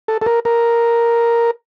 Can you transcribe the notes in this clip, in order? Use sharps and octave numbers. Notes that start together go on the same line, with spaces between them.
A4
A4
A#4
A#4